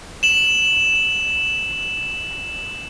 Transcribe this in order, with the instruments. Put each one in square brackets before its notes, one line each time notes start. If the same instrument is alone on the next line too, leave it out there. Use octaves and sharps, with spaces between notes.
[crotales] E7 F#7